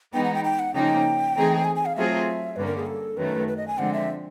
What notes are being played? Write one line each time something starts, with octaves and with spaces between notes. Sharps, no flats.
E3 G#3 B3 D#4 G5
F#5
G5
G5
F#5
C#3 F3 A#3 D#4 G5
E3 A3 C4 D#4 G#4
G#5
G#5
F5
F#3 A3 C4 F4 G#4 E5
G2 D3 G3 A#3 C#4 B4
A#4
G#4
A4
F#2 D#3 F#3 A3 B4
B4
D#5
G#5
D3 F3 G#3 C4 F#5
E5